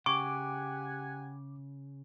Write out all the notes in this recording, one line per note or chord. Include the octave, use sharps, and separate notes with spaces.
C#3 G4 F#5 G#5 C#6 D6